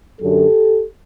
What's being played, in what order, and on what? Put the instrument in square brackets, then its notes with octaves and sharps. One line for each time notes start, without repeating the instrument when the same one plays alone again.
[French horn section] F#2 D3 F#3 G4 A4